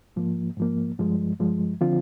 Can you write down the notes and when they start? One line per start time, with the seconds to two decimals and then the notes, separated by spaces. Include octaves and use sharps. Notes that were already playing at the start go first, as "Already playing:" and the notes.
0.16 G#2 F3 A#3
0.57 G#2 F3 A#3
0.99 G2 F3 G#3
1.40 G2 F3 G#3
1.81 D3 F3 C4 F4